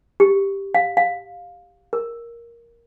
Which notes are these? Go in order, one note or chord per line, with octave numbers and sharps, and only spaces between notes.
G4
F5
F5
A#4